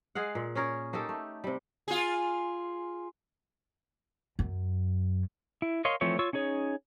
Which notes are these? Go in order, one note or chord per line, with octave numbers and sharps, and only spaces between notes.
G#3 G#4 F5 F#5
A#2
C#4 G#4 A#4 C#5
A#3 D#4 G4 A4
A3
C3 G3
F4 G#4
F#2
E4
A#4 C#5 D#5 F5 C6
E3 F3 A3 C4 C#5
F4 C#5 C#6 E6
C#4 D#4 G#4 C#5